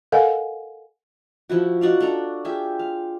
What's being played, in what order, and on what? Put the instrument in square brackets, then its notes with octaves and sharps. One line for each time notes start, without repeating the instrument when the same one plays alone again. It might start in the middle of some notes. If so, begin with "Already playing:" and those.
[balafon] A4 A#4 D#5 F5 F#5 G#5
[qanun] F3 E4 F#4
D#4 F#4 D5 F5
D4 A4 A#5
F4 G4 G#4 E5
F5